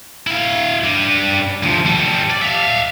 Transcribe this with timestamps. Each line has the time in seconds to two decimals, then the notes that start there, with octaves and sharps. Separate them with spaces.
0.27 E4 F5
0.84 G3 D4
1.63 D2 F3
1.86 G3 A4
2.30 D5
2.42 E5 F5